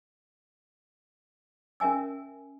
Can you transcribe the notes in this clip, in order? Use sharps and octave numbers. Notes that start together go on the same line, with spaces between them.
C#4 A#4 E5 G#5 E6